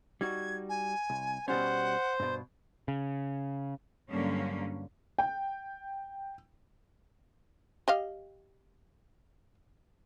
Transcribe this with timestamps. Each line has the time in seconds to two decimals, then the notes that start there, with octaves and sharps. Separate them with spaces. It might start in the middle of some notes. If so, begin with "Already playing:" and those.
0.21 G3 D#4 F#4 G#6
0.69 G#5
1.10 C2
1.48 B2 G3 C#4 C5 F#5
2.20 G2 B2
2.88 C#3
4.10 G2 D3 F#3 A#3 C#4
5.18 G5
7.88 G4 D#5 F5